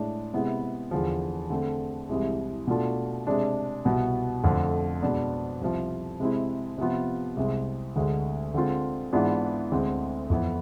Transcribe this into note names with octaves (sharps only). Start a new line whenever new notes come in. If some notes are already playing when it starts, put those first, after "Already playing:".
Already playing: A2 G#3 D4
C3 G#3 B3 E4
E2 D3 F3
D3 A3 C4
C2 C3 E3 G#3
B2 A3 D4 F4
C3 G#3 D4
C2 B2 B3
F2 D3 A3
B2 G#3 B3 D4
C2 C3 F3
C3 G#3 C4 E4
C3 F3 B3 F4
C2 C3 G#3 C4
D2 D3 G#3
D3 G#3 C4 F4
G#2 E3 B3 D4 F4
D2 D3 G#3 C4
F2 E3 B3 E4